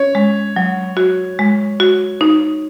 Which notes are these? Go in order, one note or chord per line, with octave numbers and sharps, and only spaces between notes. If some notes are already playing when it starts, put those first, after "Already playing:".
Already playing: C#4 C#5
G#3
F#3
F#4
G#3
F#4
D#4